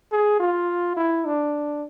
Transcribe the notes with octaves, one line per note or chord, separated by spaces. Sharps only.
G#4
F4
E4
D4